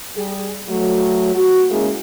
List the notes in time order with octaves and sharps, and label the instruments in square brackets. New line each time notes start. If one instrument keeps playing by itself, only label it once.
[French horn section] G3 G#4
F#3 A3
F#4
G#3 A#3 C#4 E4 G#4